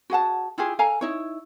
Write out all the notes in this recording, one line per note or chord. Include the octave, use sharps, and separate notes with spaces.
F#4 G#4 F#5 A5
E4 F4 G4 G#4
A4 F5 G#5 A#5
D#4 E4 C#5